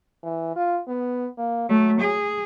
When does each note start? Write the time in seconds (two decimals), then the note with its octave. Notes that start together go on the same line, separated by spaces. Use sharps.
0.23 E3
0.56 F4
0.88 B3
1.38 A#3
1.69 F#3 A3
2.01 G#4